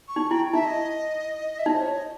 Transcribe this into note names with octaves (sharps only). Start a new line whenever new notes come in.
C#6
D#4
E4 G5
D#4 E5
D#5
E5
D#4 D#5
C5
C#5
D#5